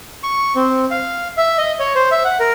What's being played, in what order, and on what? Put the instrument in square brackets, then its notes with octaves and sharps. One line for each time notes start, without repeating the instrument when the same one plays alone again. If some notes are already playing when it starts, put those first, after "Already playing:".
[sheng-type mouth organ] C#6
C4
F5
E5
D#5
C#5
C5
E5
F#5
A#4